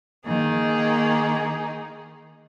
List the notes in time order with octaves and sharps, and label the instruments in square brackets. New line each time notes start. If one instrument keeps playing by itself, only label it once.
[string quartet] D#3 A#3 D#4 G#4